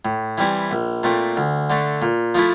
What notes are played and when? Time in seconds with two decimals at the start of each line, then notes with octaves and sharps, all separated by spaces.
0.05 A2
0.38 E3 G3 C4 E4
0.71 A#1
1.03 A#2 A3 C4
1.37 D2
1.70 D3 A3
2.02 A#2
2.35 F3 A3 E4